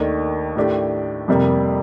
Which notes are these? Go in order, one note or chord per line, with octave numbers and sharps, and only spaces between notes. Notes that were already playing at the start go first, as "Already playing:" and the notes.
Already playing: D#2 D#3 A3 D4
A2 A3 D4 G4
F2 C3 G3 A#3